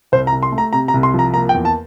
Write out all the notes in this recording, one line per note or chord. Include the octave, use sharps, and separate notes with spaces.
C2 C5
A#5
C2
C6
A3
A#5
C3 A#5
A#5
C2
C6
F3 A#5
A#3 A#5
G5
E2
A5